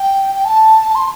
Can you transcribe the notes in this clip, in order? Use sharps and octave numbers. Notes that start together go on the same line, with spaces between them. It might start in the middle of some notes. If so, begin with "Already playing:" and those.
Already playing: G5
G5
A5
C6